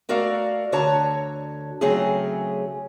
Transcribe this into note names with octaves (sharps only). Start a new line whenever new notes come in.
A3 F#4 A#4 D5 F5
D2 D3 F#4 C#5 A5 A#5
C#3 F#3 A3 C4 C#4 G#4